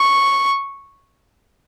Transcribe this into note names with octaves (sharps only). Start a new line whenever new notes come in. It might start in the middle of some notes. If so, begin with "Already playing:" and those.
Already playing: C#6